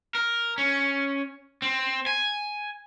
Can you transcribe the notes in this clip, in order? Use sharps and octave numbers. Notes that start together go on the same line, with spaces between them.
A#4
C#4
C4
G#5